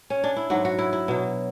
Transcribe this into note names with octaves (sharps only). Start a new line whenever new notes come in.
C#4
D4
E4
G#2 F#3 F#4
F#4
E4
E4
B2 F#3